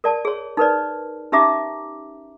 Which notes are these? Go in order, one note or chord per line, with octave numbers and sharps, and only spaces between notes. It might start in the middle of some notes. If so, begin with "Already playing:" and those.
A#4 D5 A5
G#4 C#5
D#4 A#4 B4 D5
C#4 D#4 G4 E5 A#5 D6